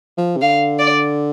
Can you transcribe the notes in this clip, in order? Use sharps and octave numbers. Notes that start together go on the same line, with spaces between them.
F3
C3
D3 F5
D5